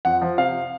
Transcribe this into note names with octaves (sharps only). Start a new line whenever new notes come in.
F2 F#5
F3
C3 F5